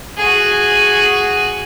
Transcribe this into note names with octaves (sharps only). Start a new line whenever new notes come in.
F#4 G#4